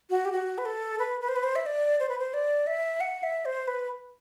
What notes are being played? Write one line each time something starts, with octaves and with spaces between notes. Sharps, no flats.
F#4
G4
F#4
B4
A4
B4
B4
C5
B4
C5
E5
D5
C5
B4
C5
D5
E5
F#5
E5
C5
B4